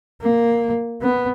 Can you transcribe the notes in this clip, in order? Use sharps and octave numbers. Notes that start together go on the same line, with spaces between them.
A#3
B3